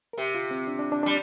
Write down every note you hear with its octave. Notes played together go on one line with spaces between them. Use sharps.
A#4
C3 G4
F4
C4
D4
D4
D4
G3 D4